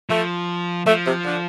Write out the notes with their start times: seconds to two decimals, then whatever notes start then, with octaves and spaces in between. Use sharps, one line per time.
0.09 F3 A3
0.86 F3 A3
1.05 C3
1.24 D3